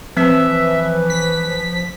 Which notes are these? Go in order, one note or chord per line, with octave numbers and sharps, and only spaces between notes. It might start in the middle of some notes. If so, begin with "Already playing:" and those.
E3 F3 C4 B4 E5
B6